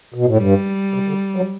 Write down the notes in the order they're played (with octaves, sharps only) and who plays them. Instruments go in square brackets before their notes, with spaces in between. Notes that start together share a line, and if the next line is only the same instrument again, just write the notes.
[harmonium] B2
A2
[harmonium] G2 [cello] G3
[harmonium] C3
D3
F#3